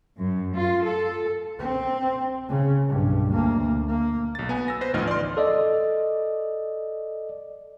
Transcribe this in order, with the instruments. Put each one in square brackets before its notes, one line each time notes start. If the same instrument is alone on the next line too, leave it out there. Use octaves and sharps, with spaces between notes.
[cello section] F#2
F4
A4
[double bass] C4
C#3
B1 G2
D2 A#3
A#3
[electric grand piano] B1 A6
B3 G#5
E6 A#6
B4 C5 A#6
A1 D2 F3 D#4 D#5 F6
D5 C6
[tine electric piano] A4 D5 D#5